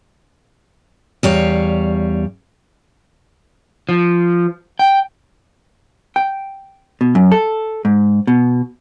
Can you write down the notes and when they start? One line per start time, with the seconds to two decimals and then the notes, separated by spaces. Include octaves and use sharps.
1.23 E2 G3 C#5 F5
3.89 F3
4.79 G5
6.16 G5
7.01 B2
7.15 F#2
7.32 A4
7.85 G#2
8.27 B2